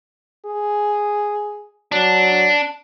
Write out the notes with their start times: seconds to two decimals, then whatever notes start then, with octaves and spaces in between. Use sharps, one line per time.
0.46 G#4
1.92 F#3 D4